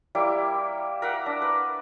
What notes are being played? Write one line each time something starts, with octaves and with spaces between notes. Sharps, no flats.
G3 A#3 E4
A#4 E5 F#5
D4
B4